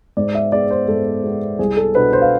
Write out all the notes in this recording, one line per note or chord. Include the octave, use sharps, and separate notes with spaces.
G#2 D5
E5
G#3 B3 D5
C5
G#2 A4
G#3 B3
C2 G#4
A4
B2 B3 D4 B4
C5
F5